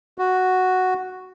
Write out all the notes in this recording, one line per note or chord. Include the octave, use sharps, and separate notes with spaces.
F#4